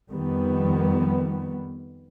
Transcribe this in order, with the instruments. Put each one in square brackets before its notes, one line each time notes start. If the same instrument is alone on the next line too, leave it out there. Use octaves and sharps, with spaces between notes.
[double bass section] F2 D#3 G3 B3